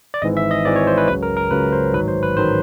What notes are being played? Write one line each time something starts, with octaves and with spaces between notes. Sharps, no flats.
D5
G#1 G#2 E3 D#5
E5
D#5
G#1 G#2 E3 D5
C#5
C5
B4
C#2 C#3 F#3 B4
A#4
A#4
C#2 C#3 F#3 B4
C5
A1 G#2 D#3 F#3 B4
C5
B4
A1 D#3 F#3 C5